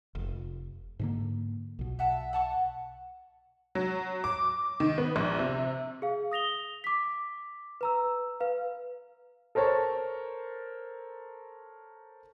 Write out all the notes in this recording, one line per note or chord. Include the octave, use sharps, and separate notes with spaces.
F1
G#2 D3 A#3
B1 B2
E5 F#5 A5
F#5 A5 C#6
F#3
D6
D#3
B3
A#1
C3
G#4 F5
D#6 A#6 F7 G7
D6 B6
B4 A#5 E6
B4 F5
A4 A#4 C5 C#5 A5